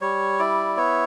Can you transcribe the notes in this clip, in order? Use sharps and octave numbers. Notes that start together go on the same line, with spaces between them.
G3 C#5
E4 D5
B3 C#5